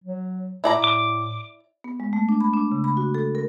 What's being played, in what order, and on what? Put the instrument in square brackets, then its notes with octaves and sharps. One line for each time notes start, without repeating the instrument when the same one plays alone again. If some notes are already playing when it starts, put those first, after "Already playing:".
[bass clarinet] F#3
[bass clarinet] A2 [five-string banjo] E4 D5 A#5
[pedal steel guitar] D6
[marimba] B3
G#3
A3
D4
B5
D4
C#3
B5
F#4
A4
A#4